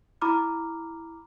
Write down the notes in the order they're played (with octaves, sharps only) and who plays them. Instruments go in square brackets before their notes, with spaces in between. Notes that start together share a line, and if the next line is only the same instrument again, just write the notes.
[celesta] E4 A#5 B5 D6 F6